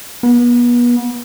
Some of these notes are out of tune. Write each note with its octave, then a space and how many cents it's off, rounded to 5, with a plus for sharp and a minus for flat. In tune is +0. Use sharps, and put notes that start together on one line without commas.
B3 -35